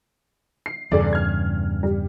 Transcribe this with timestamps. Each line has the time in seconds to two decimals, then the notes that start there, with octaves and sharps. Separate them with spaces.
0.66 C7
0.92 E2 G2 C#3 G#4 A4 D5
1.13 F6 G#6
1.83 G3